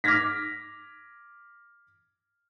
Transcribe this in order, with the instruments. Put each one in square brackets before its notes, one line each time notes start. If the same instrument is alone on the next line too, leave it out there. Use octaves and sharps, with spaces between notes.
[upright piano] D6 F6 G#6 A#6 B6